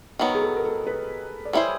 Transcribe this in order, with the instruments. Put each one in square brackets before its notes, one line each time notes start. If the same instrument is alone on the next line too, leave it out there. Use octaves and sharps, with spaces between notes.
[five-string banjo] D#3 F#3 B3
[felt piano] G#4
A4
A#4
A4
B4
D5
[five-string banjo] G3 B3 E4 G#4 C5 [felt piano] C#5